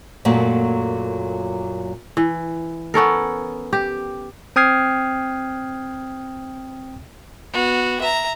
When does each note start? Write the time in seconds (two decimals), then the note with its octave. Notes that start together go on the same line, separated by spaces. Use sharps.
0.25 F#2 A#2 F#3 A3 A#3
2.17 E3
2.94 B3 C#4 A4 A#4
3.73 G4
4.56 C4 G5 D#6 F6 G#6 C7
7.53 B3 F#4
8.00 E5 A#5